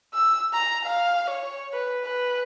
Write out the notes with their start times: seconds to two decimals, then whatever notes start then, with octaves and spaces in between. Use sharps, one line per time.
0.14 E6
0.53 A#5
0.86 F5
1.30 C#5
1.73 B4
2.05 B4